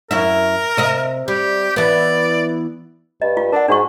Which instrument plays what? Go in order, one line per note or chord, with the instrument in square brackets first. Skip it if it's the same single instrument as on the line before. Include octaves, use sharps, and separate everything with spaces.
[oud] F#2 E4 E5 [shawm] A#4
[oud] C3 D#5 E5
[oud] G3 [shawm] G4
[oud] E3 B3 [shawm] D5
[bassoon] G2 [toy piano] D#5
[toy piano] F4
[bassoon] D4 [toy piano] A#4 F#5
[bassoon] G#2 [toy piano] D4 F#4 C#6